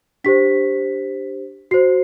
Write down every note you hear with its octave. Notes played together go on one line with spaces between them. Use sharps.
D4 G4 C5 B6
F#4 C5 C7